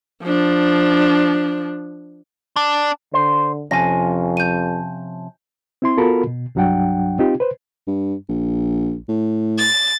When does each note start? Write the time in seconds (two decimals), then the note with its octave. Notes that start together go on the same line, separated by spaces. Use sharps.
0.24 F3 D4
2.56 D4
3.14 D3 C5
3.71 F2 C3 F3 C#4 G#5 A#6
4.37 G6 D#7
5.82 C4 E4 C6
5.97 B3 F4 F#4 A4 A#4 B5
6.27 B2
6.55 C2 G2 F#3 D4 F#5 G5
7.19 C4 D#4 F4 G4
7.40 B4 C5
7.87 G2
8.29 A#1
9.09 A2
9.58 A6